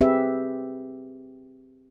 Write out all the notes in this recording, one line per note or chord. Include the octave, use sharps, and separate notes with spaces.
C4 G4 G#4 B4 E5